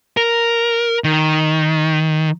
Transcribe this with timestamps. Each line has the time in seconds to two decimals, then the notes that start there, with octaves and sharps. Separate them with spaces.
0.17 A#4
1.04 D#3